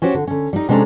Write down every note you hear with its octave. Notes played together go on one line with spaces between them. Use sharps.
C#4 F#4 G4 C5 C#5
D3
D3 C#4
G3 D#4
C3 G#3 C#4 D4 A4 A#5